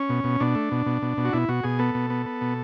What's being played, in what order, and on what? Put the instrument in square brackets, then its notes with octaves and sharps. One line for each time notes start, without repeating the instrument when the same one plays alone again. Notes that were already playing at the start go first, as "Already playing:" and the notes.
Already playing: [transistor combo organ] C#4
B2
B2
B2 D4
A3
B2
B2
B2
B2
F#4
B2 E4
B2 F#4
B2 G#4
B3 A4
B2
B3
B3
B2